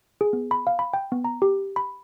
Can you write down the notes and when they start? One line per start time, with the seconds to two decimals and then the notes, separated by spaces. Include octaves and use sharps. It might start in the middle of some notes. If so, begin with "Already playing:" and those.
0.21 G#4
0.33 B3
0.51 B5
0.67 F5
0.79 B5
0.93 G5
1.12 B3
1.24 A#5
1.42 G4
1.76 B5